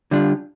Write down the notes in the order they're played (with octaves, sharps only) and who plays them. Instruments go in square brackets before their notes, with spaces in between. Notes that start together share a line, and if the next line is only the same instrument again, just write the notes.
[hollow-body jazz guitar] D3 G3 D4 F4